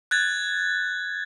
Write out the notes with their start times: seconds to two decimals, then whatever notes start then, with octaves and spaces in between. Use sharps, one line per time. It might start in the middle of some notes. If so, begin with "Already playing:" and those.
0.11 F#6 G#6 A6